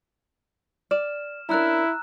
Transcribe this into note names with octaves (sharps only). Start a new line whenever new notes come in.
D5 F6 E7
C#4 D4 E4 A#4 A#5 E6 F#6